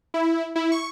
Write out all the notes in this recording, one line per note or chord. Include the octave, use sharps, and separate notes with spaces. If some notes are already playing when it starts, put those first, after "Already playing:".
E4
E4
C#6